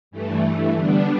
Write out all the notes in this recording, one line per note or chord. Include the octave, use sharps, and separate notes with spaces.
G2 E3 A3
D3 G3 B3 D4